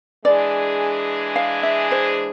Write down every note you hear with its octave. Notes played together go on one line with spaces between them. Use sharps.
E3 G#3 D4 G#4 D5
F5
E5
C5